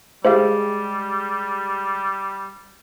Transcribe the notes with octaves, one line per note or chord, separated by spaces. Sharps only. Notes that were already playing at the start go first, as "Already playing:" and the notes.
G3 G#3 G4 G#4 C5 E5 F5